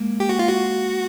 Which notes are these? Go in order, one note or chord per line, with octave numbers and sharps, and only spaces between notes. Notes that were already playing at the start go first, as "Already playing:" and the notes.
Already playing: G#3 A#3
G4
F#4
F4
F#4